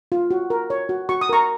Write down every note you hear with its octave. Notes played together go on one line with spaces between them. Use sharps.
F4
F#4
A#4
C#5
F#4
F#4 C#6
D#6
A#4 A#5 C#6